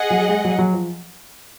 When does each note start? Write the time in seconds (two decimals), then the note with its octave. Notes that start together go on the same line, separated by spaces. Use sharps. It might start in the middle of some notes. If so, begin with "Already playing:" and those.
Already playing: G#4 D#5 F#5
0.10 F#3
0.29 G#3
0.44 F#3
0.58 F#3
0.73 F3